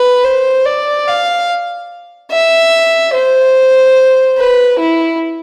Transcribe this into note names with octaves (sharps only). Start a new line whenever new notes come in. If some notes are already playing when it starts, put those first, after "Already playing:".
Already playing: B4
C5
D5
F5
E5
C5
B4
E4